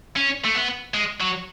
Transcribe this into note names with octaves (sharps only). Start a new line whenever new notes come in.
C#4
A3
B3
G#3
F#3